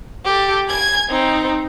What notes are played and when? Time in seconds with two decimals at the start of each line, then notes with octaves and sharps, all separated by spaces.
0.25 G4 A4
0.68 G#5 G#6
1.09 C4 D#4